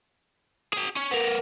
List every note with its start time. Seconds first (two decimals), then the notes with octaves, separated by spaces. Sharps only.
0.73 G#4 G5
0.96 C#4
1.11 B3 A#4